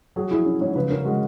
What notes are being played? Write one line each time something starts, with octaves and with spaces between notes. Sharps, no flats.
F#3 G#4
E4 G#4
C#4
G#2 C#5
C#3 B4
C#4 A#4
G#3 F#4